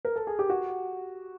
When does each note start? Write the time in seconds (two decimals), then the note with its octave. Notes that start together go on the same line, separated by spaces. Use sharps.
0.05 A#4
0.16 A4
0.27 G#4
0.39 G4
0.50 F#4